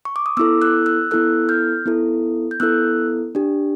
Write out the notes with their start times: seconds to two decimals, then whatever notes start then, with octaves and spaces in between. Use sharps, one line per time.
0.05 C#6
0.16 D6
0.26 D#6
0.37 B3 E4 A4 D6 E6
0.62 E6 F#6
0.86 E6 F#6
1.11 B3 E4 A4 E6 F#6
1.49 F6 G6
1.86 B3 E4 A4
2.51 G6
2.60 B3 E4 A4 E6 F#6
3.35 D4 G4